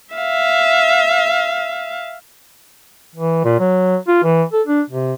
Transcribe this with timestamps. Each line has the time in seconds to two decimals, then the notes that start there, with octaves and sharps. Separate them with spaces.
0.14 E5 F5
3.15 E3
3.44 A#2
3.59 F#3
4.07 F4
4.23 E3
4.52 A4
4.66 D4
4.90 C3